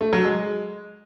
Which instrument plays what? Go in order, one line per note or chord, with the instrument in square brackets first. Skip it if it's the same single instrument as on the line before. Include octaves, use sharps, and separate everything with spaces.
[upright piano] A3
F#3
G#3